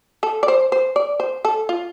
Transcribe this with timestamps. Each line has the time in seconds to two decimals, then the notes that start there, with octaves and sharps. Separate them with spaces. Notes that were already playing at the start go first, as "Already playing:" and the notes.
0.23 A4
0.43 D5
0.48 C5
0.72 C5
0.96 D5
1.20 C5
1.45 A4
1.69 F4